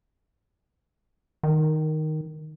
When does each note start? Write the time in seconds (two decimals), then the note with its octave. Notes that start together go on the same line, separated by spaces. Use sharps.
1.43 D#3